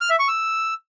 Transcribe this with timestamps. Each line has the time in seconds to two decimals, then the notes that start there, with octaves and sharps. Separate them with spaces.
0.01 F6
0.10 E5
0.19 C#6
0.28 E6